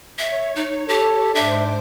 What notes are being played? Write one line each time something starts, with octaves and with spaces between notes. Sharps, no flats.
C#5 E5
D#4
G4 A4
G#2 D4 C5 E5 D6